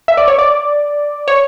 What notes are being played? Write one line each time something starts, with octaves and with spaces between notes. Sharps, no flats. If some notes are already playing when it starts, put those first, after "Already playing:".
E5
D5
C#5
D5
C#5